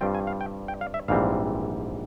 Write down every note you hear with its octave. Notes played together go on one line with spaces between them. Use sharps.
G2 G3 C4 F4 G5
G#5
F5
G5
G5
F5
E5
A#1 G#2 E3 G3 C4 F5